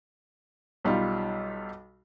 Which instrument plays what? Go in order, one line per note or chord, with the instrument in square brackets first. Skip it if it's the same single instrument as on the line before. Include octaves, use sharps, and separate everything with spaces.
[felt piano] B1 G3 D#4 F4